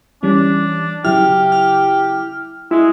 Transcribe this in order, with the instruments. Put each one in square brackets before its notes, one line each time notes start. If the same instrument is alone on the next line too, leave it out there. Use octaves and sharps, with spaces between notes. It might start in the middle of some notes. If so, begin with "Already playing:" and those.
[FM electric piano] E3 G3 C#4 [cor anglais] D4
[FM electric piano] C#3 F#3 E4 [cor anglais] G4 [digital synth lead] F6
[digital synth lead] F6
[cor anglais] G#3 [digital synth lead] E4